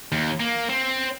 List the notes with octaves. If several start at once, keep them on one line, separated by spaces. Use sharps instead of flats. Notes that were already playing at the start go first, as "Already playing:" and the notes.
D#2
A#3
C4